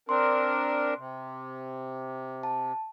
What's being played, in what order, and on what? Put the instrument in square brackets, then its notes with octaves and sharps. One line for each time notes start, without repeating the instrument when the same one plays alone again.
[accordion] C4 D4 A#4 [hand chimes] C6
[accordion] C3
[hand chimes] A5